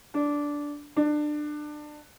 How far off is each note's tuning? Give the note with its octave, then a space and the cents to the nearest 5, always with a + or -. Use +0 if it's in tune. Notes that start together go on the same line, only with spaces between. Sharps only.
D4 -10
D4 +25